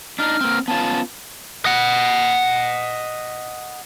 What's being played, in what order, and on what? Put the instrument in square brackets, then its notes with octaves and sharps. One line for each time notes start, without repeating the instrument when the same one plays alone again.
[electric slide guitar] D4 D#4 [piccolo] F6
[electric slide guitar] A#3 C4
[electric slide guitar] B3 C#4 F4 [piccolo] A5
[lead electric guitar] D#5 F#5